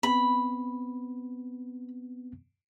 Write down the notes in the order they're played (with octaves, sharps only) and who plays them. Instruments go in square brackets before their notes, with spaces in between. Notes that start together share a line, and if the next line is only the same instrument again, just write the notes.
[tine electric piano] B3 C4 [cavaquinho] B5